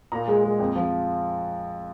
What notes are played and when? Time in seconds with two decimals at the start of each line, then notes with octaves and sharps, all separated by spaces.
0.12 A#2 A#5
0.28 G#3
0.44 G#3
0.59 F2
0.75 F3